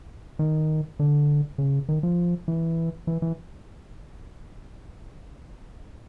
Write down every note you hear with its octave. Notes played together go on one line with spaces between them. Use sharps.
D#3
D3
C#3
D#3
F3
E3
E3
E3